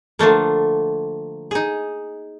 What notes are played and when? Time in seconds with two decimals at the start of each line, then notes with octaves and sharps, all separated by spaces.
0.19 D3 F3 A3 A#3
1.51 D#4 G#4